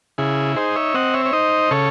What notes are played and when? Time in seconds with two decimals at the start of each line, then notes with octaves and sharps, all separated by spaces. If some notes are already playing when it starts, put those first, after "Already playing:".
0.18 C#3 E4 G#4
0.56 D#4 G#4 C5
0.76 C#5 E5
0.94 C4 D#5 F#5
1.14 C#5 E5
1.26 C#5
1.33 D#4 C5 D#5
1.71 C#3 A4 C#5